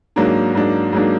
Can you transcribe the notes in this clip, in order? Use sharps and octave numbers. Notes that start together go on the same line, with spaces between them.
G#2 F#3 A#3 D4
G#2 F#3 A#3 D4
G#2 F#3 A#3 D4